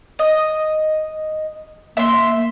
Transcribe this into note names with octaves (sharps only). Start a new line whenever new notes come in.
D#5
A#3 E5 C6